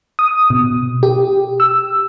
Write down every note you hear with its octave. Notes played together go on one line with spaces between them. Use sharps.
D#6
B2
G4
E6